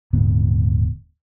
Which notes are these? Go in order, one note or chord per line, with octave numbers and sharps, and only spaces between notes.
D#1 G#2 D3 B3